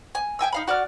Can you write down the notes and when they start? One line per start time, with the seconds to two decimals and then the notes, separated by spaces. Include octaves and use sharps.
0.15 G#5
0.39 E5 G5 G#5 E6
0.52 D#4 F5 B5
0.67 F#4 D5 F#5 F6